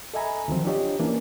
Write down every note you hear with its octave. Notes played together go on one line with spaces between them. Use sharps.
A4 D#5 E5 G#5 A#5 B5
D2 D#3 F3 F#3 C4
D4 F4 G4 C#5 D#5
E3 A#3 C#4 D4